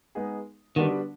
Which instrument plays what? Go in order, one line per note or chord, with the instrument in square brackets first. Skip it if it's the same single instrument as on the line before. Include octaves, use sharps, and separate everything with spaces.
[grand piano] G#3 B3 D#4 G#4
[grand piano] D3 G3 B3 D4 F#4 [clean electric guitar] D#3